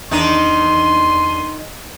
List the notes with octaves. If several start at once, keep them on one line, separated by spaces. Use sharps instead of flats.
E2 D#3 D4 D#4 C6 D#7